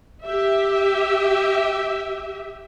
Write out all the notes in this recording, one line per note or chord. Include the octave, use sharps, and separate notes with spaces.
G4 E5